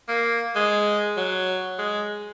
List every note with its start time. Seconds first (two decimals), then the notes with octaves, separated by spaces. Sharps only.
0.08 A#3
0.55 G#3
1.17 F#3
1.79 G#3